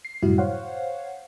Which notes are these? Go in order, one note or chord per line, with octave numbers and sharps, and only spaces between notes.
C7
F#2 A2 C3 G3 E4 F#4
C5 C#5 F5 F#5